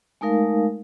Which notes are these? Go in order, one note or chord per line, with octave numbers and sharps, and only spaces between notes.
G#3 A3 D#4 A#4 F5